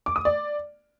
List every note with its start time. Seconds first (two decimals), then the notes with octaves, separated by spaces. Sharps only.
0.06 D6
0.16 D#6
0.25 D5